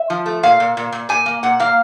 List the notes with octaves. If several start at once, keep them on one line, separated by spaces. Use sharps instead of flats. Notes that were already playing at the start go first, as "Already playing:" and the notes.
Already playing: E5
F3
A3
A#2 F5
A#2
A#2
A#2
A#2 G#5
A#3
A#2 F#5
A#3 F5